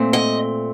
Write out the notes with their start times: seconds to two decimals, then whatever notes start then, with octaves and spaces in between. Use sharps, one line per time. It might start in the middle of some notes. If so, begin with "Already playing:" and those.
Already playing: A#2 A3 C4
0.13 D#5